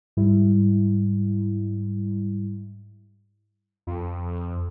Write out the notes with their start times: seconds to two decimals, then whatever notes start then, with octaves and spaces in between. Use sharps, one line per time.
0.17 G#2 G3 E4
3.87 F2